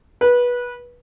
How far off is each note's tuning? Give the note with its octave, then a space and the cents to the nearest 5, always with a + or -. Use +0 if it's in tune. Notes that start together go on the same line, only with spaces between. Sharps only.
B4 -20